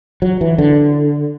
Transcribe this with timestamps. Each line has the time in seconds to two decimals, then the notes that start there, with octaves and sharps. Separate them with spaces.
0.22 F#3
0.41 E3
0.58 D3